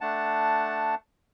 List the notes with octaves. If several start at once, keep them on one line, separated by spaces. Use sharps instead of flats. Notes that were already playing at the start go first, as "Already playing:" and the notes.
A3 D4 F#5 A5